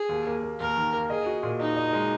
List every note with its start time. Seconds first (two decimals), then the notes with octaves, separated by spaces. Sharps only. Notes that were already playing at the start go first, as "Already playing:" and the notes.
Already playing: G#4
0.09 D#2
0.27 A#3
0.43 A#3
0.60 D#2 A#4
0.76 D#3
0.93 A#3
1.10 G#4 D#5
1.26 F#4
1.43 A#2
1.59 D#4 D#5
1.77 D#5
1.93 G#3